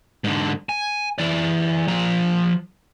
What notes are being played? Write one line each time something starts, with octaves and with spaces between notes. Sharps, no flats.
G#2 D3
G#5
E3 D5
F3 A#5